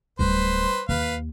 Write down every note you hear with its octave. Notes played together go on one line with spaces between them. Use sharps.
D1 G3 B4 C5
D#2 B4 F5